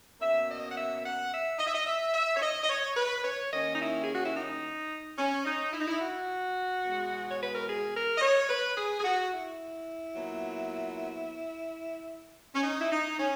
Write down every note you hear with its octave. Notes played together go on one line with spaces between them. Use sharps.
B2 A#3 C#4 E5
D#5
F#5
E5
E5
F#5
E5
D#5
E5
D#5
E5
E5
C#5
D#5
D#5
C#5
B4
C#5
D#2 D#3 A#3 C#4 D#5
D#4
E4
G#4
F#4
E4
D#4
C#4
D#4
E4
D#4
E4
F#4
E2 B2 G#3
C#5
B4
A#4
G#4
A#4
D#5
C#5
B4
G#4
G#4
F#4
E4
A#2 F#3 B3
C#4
D#4
E4
D#4
C#4